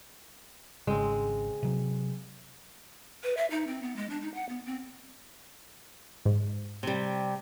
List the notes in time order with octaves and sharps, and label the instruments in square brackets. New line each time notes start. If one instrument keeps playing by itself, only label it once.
[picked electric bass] G#1 C#3 [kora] G#3 C4
[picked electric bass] C3 F#3
[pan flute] B4
E5
D#4
C4
B3
G#3
D4
D#4
F#5
B3
C4
[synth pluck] G#2
[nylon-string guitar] C3 G3